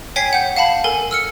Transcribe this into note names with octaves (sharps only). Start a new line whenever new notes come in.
C#5 G5 G#5 G#6 B6 C7
F#5 G6
F5 F#5 A5 B5
A4 A#4 G#5
E6 F6 C#7